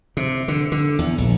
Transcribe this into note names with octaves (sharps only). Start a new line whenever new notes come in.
C3
D3
D3
E2
A#1